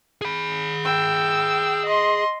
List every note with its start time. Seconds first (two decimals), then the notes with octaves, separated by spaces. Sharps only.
0.22 G#4 B5
0.84 G5 E6
1.86 D#5 C6